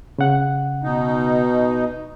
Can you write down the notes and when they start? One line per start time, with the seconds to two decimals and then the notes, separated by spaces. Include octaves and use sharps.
0.18 C#3 F#5
0.83 B2 D#4